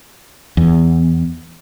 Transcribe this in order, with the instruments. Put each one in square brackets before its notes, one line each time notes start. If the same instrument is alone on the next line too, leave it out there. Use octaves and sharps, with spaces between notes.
[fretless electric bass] E2